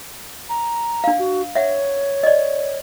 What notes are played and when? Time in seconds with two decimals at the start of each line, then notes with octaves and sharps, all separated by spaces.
0.49 A#5
1.04 D4 F5
1.19 F#4
1.55 C#5 E5 F#5
2.23 D5 D#5